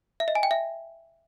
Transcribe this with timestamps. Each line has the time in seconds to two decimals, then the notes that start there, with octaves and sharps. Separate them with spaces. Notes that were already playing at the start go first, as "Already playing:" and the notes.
0.20 E5
0.28 D#5
0.35 G#5
0.43 G5
0.51 E5